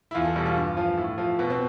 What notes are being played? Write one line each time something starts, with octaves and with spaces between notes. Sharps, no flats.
E4
E2 F4
A4
B2 G3
F4
G2
F3
A2
F3
B2 B3
C4